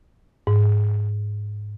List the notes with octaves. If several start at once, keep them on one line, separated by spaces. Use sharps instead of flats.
G#2